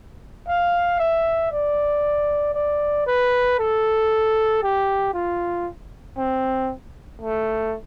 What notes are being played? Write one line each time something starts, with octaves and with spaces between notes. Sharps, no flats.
F5
E5
D5
D5
B4
A4
G4
F4
C4
A3